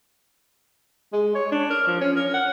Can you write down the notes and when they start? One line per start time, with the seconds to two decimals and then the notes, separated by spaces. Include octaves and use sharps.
1.13 G#3
1.35 C#5
1.52 D4
1.70 A#4
1.87 F3
2.01 C#4
2.16 A#4
2.34 F#5